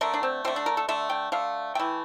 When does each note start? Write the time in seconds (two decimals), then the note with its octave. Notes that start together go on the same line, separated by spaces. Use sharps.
0.01 D3 A3 A#4
0.14 D4
0.23 C4
0.45 D3 A3 C4
0.56 D4
0.66 A#4
0.77 A4
0.88 D3 A3 E5
1.10 G5
1.32 D3 A3 F5
1.75 E3 A3 G5